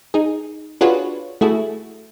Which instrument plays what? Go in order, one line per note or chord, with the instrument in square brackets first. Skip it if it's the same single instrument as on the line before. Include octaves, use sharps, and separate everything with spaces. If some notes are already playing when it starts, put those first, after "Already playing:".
[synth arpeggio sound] D#4 G#4
D4 F4 F#4 G#4 B4 C#5
A3 E4 F#4 G#4 A4